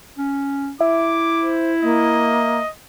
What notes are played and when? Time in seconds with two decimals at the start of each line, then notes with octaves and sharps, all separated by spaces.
0.18 C#4
0.81 E4 E5 D6
1.42 C5
1.83 A#3 D#5